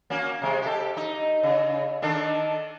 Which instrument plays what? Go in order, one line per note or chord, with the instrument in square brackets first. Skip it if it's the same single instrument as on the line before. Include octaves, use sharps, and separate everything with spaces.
[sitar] A#3 C#4 F#4
C3 G#3
G4 A4
D#4
C#3
D#3 D4 A4